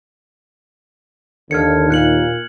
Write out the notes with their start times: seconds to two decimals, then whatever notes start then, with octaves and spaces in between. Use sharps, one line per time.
1.51 D#2 D3 F6 G#6 C#7
1.90 A#2 F#6 C#7 F#7